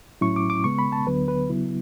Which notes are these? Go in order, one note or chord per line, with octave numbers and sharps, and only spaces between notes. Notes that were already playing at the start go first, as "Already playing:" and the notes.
A2 F#3 C#4 E4 C#6
D6
D6
C#3 G#3 B3 C#6
B5
A5
D2 D3 F#3 B3 B4
B4
C#3 F#3 B3 E4